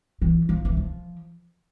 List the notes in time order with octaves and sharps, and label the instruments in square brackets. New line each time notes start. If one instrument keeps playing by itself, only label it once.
[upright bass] E3
F3
E3
F3